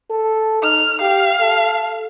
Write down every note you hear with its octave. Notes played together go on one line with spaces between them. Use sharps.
A4
D#4 F6
G4 F5
A4